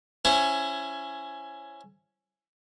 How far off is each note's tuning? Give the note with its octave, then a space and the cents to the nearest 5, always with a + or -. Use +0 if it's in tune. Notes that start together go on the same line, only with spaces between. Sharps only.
C#4 +0 E4 +20 C5 +5